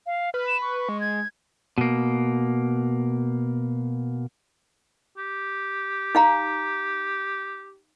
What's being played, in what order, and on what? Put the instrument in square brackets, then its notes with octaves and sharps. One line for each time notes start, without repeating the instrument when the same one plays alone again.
[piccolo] F5
[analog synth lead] B4 [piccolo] F6
[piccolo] E7
C#6
[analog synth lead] G#3
[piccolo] G#6
[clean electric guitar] B2 A#3
[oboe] G4
[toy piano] D#4 F5 A#5